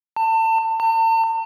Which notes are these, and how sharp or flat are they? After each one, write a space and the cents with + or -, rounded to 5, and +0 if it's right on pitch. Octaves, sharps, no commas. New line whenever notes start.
A5 +30
A5 +45